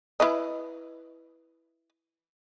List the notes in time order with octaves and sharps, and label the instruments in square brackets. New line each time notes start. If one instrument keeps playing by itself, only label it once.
[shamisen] E4 B4 D#5